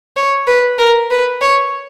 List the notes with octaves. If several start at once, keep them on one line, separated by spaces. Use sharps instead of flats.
C#5
B4
A#4
B4
C#5